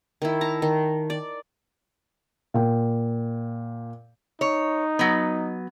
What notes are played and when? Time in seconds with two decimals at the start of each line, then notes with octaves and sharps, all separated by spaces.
0.22 D#3 E4
0.41 A5 A#5
0.62 D#3
1.10 D5
2.54 A#2 G5
4.41 D#4 C#5
4.99 F#3 B3